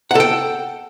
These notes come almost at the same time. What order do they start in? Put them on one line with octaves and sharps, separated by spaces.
F#5 A4 G5